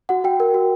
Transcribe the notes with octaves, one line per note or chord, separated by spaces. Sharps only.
F#4 F#5
F#4 G5
A#4
F#4